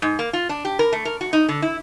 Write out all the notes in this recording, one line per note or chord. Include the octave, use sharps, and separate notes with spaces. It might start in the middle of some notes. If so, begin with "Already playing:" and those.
G#2
A#3
F4
D4
G4
A#4
A3
A#4
F#4
D#4
D3
E4